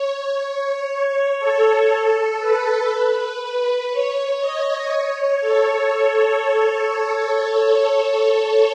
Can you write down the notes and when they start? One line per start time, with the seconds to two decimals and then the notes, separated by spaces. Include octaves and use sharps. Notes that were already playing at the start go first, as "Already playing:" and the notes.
Already playing: C#5
0.40 C#5
1.40 A4
2.40 B4
2.90 B4
3.90 C#5
4.40 D#5
4.90 C#5
5.41 A4